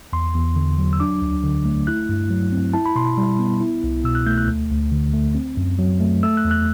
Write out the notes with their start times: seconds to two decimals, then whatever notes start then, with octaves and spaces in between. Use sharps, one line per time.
0.13 E2 C6
0.34 E2
0.56 D3
0.78 F#3
0.93 E6
1.00 D4 D6
1.22 D2
1.44 D3
1.65 A3
1.87 E4 F#6
2.09 G2
2.30 F#3
2.52 C4
2.73 E4 A5
2.86 B5
2.96 B2 C6
3.18 G3
3.39 B3
3.61 E4
3.84 C2
4.04 B2 E6
4.15 F#6
4.26 A3 G6
4.38 F#6
4.48 D2
4.70 D2
4.92 D3
5.13 A3
5.35 C4
5.57 F#2
5.79 F#3
6.00 A3
6.23 A3 E6
6.37 F#6
6.45 E2
6.51 F#6